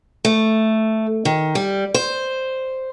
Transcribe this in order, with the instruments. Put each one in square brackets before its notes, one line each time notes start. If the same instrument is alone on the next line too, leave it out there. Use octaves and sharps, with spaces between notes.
[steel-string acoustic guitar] A3
D#3
G3
C5